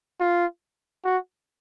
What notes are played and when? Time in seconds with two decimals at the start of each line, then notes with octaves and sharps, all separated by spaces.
0.20 F4
1.05 F#4